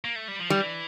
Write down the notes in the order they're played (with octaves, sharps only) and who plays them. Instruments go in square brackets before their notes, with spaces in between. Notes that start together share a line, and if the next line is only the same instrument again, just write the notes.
[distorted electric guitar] A#3
A3
G3
F3
[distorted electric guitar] E3 [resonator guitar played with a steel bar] G3